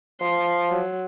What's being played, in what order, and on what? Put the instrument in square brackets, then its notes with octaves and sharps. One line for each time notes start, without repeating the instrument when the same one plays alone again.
[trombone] F3 [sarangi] C6
[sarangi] F#3